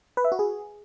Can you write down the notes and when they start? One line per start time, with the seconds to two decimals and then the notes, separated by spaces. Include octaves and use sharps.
0.17 B4
0.24 E5
0.32 F#4
0.39 G#4